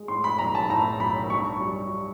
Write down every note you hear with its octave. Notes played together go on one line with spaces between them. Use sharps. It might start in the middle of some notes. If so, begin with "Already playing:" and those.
Already playing: G#3
A2 C6
B5
B1 A#5
A5
A2 A#5
B1 B5
G2 C#6
G3